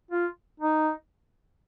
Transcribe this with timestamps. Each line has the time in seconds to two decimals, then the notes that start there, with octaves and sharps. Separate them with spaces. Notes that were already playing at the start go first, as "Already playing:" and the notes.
0.11 F4
0.60 D#4